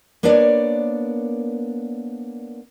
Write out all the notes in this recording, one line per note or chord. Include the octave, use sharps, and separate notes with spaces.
A#3 B3 D4 C#5 D5